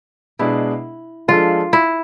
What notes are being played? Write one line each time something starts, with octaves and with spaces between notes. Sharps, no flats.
B2 G#3 D4 E4 G#4
F3 G#3 D4 F4 A4
E4